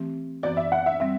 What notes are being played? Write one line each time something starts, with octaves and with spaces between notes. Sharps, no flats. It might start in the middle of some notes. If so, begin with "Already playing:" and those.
Already playing: E3 A3 C4 G4
F#2 E3 B3 F#4 D5
E5
F#5
E5
G3 C4 E5